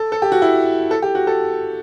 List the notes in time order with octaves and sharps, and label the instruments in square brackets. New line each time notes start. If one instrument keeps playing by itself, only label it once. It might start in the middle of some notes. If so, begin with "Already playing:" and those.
Already playing: [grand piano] A4
A4
G4
F#4
E4
A4
G4
F#4
A4